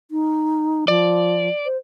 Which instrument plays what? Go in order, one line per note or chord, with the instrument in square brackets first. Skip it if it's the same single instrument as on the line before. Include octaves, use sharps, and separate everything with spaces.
[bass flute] D#4
[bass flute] F3 [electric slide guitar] D5
[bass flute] C5